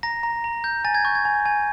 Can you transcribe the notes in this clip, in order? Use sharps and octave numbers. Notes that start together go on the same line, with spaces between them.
A#5 A#6
A#5
A#5
G6
G#5 A6
G#6
C#6 G6
G#6
G#5
G#5